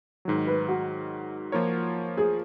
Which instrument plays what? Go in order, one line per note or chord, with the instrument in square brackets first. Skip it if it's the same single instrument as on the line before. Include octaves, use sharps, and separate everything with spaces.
[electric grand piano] G#2 D#3 F#3
[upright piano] B4
F#4
[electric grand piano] F3 A#3 F4 A#4 C#5
[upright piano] G#4